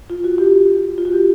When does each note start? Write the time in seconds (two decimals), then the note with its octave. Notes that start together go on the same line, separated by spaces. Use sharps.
0.10 F4
0.24 F#4
0.38 G4
0.98 F4
1.05 F#4
1.13 G4